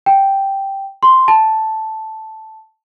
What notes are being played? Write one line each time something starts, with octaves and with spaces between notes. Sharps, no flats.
G5
C6
A5